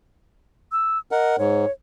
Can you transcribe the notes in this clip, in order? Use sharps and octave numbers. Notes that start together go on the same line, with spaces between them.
E6
A#4 D#5 F#5
G#2 C#5